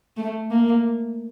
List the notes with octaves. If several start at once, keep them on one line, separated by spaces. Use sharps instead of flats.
A3
A#3